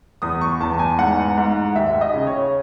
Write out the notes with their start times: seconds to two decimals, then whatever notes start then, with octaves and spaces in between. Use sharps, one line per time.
0.22 E2 D#6
0.41 C#6
0.60 E2 A5
0.79 G#5
0.98 G#2 F#5
1.38 G#2
1.75 D#2 E5
2.01 D#5
2.13 C#3
2.27 C#5